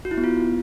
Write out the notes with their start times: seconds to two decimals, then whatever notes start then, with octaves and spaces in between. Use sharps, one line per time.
0.05 F#4
0.11 E4
0.17 B3
0.24 F4